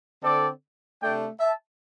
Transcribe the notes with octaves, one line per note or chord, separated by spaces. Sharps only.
D3 C4 A4 D5
C3 A3 D4 D5 G5
E5 A5